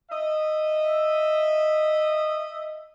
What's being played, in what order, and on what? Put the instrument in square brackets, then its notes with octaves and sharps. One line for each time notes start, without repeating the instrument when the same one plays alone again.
[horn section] D#5 E5